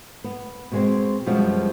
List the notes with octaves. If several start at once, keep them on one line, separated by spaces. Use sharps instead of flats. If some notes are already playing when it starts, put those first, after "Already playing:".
B3
B2 G#3 C4
F#2 B2 F3 G3 G#3